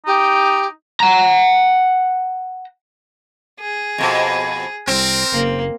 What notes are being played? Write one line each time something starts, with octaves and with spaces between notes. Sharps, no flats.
D#4 G4
F#5 A#5
G#4
F2 B2
C2 C4 A#4
F#1 A#3